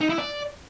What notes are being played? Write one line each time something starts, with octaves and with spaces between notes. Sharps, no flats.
D#4
E4
D5